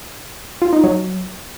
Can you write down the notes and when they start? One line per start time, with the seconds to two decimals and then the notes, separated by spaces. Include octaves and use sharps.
0.62 F4
0.73 D#4
0.84 F#3